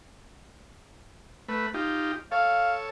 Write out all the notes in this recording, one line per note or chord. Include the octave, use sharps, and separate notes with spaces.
A3 B4
D#4 F4 G4
A4 C#5 F5